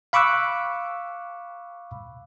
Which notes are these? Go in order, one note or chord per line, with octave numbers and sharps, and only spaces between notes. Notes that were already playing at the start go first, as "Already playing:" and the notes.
F5 B5 C#6 D6 E6 F#6